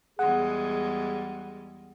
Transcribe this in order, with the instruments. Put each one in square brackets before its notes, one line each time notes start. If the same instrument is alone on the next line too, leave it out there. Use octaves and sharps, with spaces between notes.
[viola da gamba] E2 G3 G#3 [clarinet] G#4 [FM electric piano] F#5